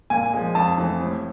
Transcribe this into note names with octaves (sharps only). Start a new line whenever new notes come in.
A#2 G#5
F3 G#3
F2 A5
C3 E3 A3 C4
A2